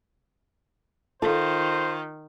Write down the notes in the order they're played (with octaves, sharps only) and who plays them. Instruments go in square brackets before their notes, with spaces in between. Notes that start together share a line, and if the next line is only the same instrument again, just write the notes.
[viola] D#3 [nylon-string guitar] F4 [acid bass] A4 [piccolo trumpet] C5